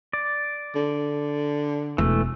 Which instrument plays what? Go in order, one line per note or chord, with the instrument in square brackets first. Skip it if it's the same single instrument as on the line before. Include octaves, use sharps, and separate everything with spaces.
[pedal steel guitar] D5
[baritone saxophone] D3
[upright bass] E1 [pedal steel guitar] E3 A3